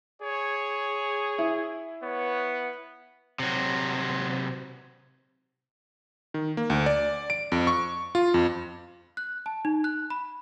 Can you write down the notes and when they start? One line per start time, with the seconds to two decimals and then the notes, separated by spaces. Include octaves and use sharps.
0.22 G#4 C#5
1.39 E4
2.02 B3 C#5
3.39 C3 F#3
6.34 D#3
6.57 A#3
6.70 D2
6.86 D5
7.30 D7
7.52 F2
7.67 C#6
8.15 F4
8.34 F2
9.17 F#6
9.46 A5
9.65 D#4
9.84 F#6
10.10 B5